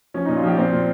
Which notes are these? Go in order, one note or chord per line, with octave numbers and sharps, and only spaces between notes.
F3 C#4
A#2 D#4
F4
F3 G4
A#2 C4
A#2